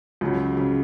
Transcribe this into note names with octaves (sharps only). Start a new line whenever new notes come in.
C#2 C#3 F#3
C#3 F#3